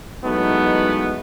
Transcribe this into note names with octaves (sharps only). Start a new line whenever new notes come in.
E3 F#3 G#3 A3 B3 D#4